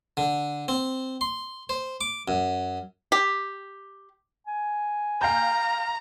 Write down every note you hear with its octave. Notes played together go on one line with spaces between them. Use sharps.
D3
C4
C6
C5
D6
F#2
G4
G#5
F5 G5 A#5 G6